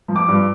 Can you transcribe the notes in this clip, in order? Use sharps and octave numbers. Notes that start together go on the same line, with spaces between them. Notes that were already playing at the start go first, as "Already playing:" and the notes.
F3
D6
G2